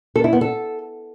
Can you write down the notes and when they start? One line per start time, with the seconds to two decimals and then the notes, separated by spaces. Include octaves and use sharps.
0.16 A4
0.24 E4
0.33 B3
0.41 A4